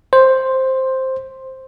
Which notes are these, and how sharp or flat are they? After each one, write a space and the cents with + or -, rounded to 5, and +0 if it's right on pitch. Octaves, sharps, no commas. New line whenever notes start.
C5 +5